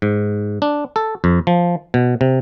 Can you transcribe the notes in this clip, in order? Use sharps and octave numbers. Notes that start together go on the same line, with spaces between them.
G#2
D4
A4
F2
F3
B2
C3